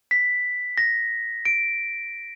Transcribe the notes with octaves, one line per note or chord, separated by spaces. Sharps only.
B6
A#6
D7